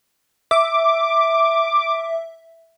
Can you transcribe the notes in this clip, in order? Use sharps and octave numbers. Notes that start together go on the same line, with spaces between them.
E5 D6